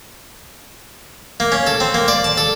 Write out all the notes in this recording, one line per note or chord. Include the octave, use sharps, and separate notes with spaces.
A#3
C#4
A4
C4
A#3
D5
A5
A4